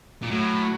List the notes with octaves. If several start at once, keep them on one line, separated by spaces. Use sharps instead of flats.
A#2
A2 F#3